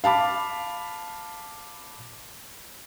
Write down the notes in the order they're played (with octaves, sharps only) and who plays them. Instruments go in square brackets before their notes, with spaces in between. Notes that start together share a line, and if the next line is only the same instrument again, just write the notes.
[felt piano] F5 A5 B5 D6